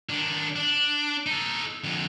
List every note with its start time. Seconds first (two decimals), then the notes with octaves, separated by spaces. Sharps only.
0.09 D#3 D4
0.56 D4
1.26 D#4 A4
1.84 F2 D3